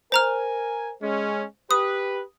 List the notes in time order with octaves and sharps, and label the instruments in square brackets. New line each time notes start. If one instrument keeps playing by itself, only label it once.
[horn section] A#4 G#5 [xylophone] C5 A#5 F6
[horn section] G#3 C#4
[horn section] G4 B4 [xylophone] D#6